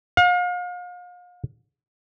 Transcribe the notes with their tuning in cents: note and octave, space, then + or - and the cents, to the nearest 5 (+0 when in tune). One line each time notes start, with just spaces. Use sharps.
F5 +40